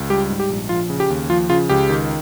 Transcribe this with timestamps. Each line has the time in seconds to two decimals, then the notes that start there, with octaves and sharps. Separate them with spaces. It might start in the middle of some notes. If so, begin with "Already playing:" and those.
Already playing: C#2
0.10 G3 G4
0.30 G#2
0.40 G4
0.50 A#1
0.69 F3 F4
0.90 C#3
1.00 G4
1.10 D#2
1.30 F3 F4
1.49 C#3 F4
1.69 C#2 G4
1.90 D#3